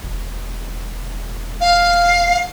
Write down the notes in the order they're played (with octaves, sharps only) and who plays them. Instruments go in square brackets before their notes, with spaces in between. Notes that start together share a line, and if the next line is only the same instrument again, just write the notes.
[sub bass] E1
[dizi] F5